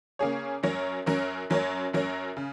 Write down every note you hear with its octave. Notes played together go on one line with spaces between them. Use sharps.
C#3 A#3 C#4 G#4 C#5
F#2 F#3 C#4 A#4 C#5
F#2 F#3 C#4 A#4 C#5
F#2 F#3 C#4 A#4 C#5
F#2 F#3 C#4 A#4 C#5
C#3